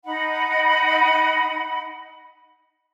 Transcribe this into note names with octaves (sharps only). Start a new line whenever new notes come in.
D#4 F#5 B5